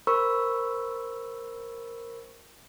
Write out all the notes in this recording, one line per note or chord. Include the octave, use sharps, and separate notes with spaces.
A#4 C5 B5 C#6 E6